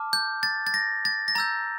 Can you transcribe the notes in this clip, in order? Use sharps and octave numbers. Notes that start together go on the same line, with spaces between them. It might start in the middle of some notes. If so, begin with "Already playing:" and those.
Already playing: A5 D6 F6
G6
A6
A6
A#6
A6
A#6
A#5 E6 G6 A6